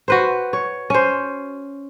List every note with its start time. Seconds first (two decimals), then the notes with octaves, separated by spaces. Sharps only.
0.08 F#4 B4 C5
0.53 C#5
0.90 C#4 C5